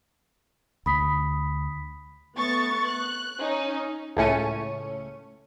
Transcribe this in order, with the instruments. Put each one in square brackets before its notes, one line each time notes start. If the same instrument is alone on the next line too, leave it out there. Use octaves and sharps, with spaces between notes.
[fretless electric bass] D2 [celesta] B5 D#6 B6
[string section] A3 B3 C#6 A6
F#6
C#4 D#4
[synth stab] C#2 A2 A3 C#4 C#6 D#7